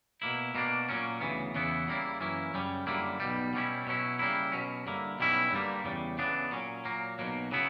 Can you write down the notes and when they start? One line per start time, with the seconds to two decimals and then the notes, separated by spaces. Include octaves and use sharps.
0.22 B2 A#3 E4
0.55 B2 A#3 D4
0.89 A#2 F#3 A#3 C#4
1.21 D2 C#3 E3 B3
1.54 E2 C#3 E3 B3 E4
1.88 C#3 G3 A#3 E4
2.21 F#2 E3 A#3 C#4 E4
2.54 F#2 C#3 G3 C#4
2.87 F#2 D3 G3 A#3 E4
3.20 B1 B2 G3
3.54 B2 G3 C#4 E4
3.87 B2 F#3 C#4 E4
4.19 C#3 G3 A#3 E4
4.52 B2 F#3 C#4
4.86 G2 D3 A#3 E4
5.19 B1 B2 G3 C#4 E4
5.52 G2 D3 G3 A#3
5.85 E2 C#3 G3
6.18 C#3 E3 B3 D4
6.51 A#2 F#3 C#4
6.85 A#2 F#3 A#3
7.19 B1 B2 F#3 A#3
7.52 C#3 F#3 B3 E4